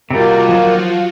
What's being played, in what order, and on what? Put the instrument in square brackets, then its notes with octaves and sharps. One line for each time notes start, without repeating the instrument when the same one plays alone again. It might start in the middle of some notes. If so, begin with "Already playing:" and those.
[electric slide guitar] C3 G3 [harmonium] D#3 A#3 [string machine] F4 F#4
[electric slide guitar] F3 [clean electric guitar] F#3